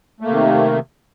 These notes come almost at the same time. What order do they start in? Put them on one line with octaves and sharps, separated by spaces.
A3 A#3 C3 D#3